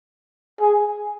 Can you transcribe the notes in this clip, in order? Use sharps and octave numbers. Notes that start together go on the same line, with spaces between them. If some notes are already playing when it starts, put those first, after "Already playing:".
G#4